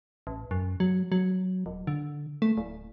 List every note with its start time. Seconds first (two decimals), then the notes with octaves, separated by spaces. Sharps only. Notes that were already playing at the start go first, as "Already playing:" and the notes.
0.27 A1
0.51 F#2
0.80 F#3
1.12 F#3
1.66 D#1
1.87 D3
2.42 A3
2.57 D1